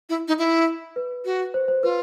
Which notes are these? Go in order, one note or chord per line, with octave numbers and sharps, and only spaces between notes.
E4
D#4
E4
B4
F#4
C5
C5
F4 B4